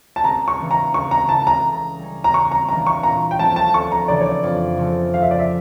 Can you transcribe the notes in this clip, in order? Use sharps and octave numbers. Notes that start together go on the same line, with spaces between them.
A5
C#2 A#5
C#6
C#3 E3 A#3 D4
A#5
C#2 C#6
A#5
C#3 E3 A3 E4 A5
A#5
C#3
G3 C#4
A#5
C#3 C#6
A#5
E3 G3 A#3 D4 A#5
C#6
A#2 A#5
G5
F3 A3 C#4 A5
A5
D2 C#6
A#5
C#3 E3 A3 D4 D5
C#5
D5
F2
C#3 F3 A3
C#3 F5
E5
D5
E5